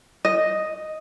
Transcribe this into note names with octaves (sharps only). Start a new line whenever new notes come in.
D#5